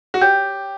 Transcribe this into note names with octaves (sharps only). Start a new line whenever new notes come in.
F#4
G4 C#5 G5 D6 G6